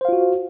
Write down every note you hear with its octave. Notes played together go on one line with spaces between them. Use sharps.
F4 F#4 C5 F5